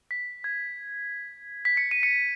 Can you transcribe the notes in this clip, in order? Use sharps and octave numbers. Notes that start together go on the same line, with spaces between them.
B6
G#6
B6
C#7
D#7
C#7